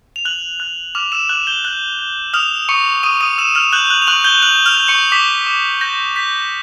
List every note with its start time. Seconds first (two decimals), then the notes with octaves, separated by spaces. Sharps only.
0.16 F7
0.25 F#6 F#7
0.60 F#6
0.95 D6 F6 F7
1.12 E6 E7
1.29 D6 F#6 F#7
1.47 G6 G7
1.64 F#6 G6 F#7
1.99 G6
2.34 D#6 F6 F7
2.69 C#6 D#6 C#7
3.03 C#6 D#6 D#7
3.21 D#6 D#7
3.38 E6 E7
3.55 F6 F7
3.72 F#6 G6 F#7
3.90 F#6 F#7
4.02 F7
4.07 C#6 F#6 F#7
4.24 G6 G7
4.42 F#6 G6 F#7
4.66 F6 F7
4.77 G6
4.88 C#6 C#7
5.12 D6 B6
5.47 D6
5.81 G6 A#6
6.16 G6 B6